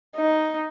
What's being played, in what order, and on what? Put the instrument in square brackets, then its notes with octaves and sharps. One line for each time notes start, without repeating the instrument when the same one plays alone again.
[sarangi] D#4